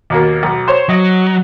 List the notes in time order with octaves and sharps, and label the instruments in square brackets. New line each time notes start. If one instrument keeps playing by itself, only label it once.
[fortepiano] D#2 B2 A#3
B1
C5 C#5
[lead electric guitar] F#3 [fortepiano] D#5